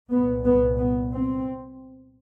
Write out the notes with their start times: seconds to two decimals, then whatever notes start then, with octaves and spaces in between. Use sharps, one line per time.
0.11 C2 A#2 B3
0.45 B3
0.78 B3
1.13 C4